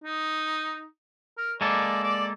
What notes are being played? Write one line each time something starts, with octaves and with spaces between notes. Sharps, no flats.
D#4
A#4
G#3 A#3 A4 D5
D5